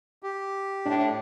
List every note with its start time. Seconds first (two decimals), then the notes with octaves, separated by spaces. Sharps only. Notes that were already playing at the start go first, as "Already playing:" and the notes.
0.23 G4
0.85 A2 D4